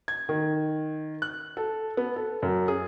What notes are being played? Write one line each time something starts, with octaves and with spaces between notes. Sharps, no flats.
G#6
D#3
F#6
A4
B3
A4
F#2
G#4